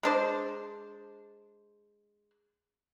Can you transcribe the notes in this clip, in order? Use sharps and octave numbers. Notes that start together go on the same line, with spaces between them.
G#3 D4 C5